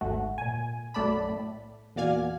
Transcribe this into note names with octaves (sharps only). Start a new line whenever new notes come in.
G#1 D2 G#2 A3 F#4
A#2 G#5
B1 F#2 A3 D5 A5 B5
A2
E2 A#2 F#4 D5 F5 G#5